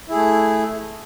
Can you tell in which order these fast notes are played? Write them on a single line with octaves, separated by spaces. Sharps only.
E4 G#4 A3